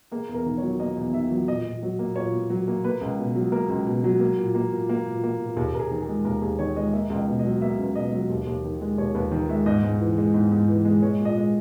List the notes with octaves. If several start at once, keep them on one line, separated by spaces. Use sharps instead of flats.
A#3 G#4
E2
A#4
D#3
C#5
F#3
A#3 D#5
E2
D#3 E5
F#3
A#2 D#5
A#2
F#3
A#3
A#2 C#5
A#2
F#3
A#3
A#3 B4
C#2
B2
F#3
A#3 A#4
C#2
B2
F#3
A#3
A#2
A#3
A#2
A#3
A#2
A#3
A#2
D#2 G#4
D#2 A#4
G#4
D#3
G#4
G#3
D#2 A#4
D#2 G#4
D#3 C#5
G#3 D#5
A#3 E5
C#2
D#5
B2
D#5
F#3
A#3 E5
C#2
B2 D#5
F#3
D#2
D#2
D#3
G#3
D#2 C#5
D#2 B4
D#3 A#4
G#3 E5
G#2 D#5
G#2
E3
G#3
G#2
G#2
E3
G#3
G#3 C#5
A#2
D#5
G#3